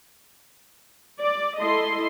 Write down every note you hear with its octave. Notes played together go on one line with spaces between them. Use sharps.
D5
E4 A4 D#5 C6